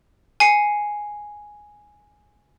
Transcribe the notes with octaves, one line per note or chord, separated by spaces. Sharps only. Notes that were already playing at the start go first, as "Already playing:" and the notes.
G#5 C7 C#7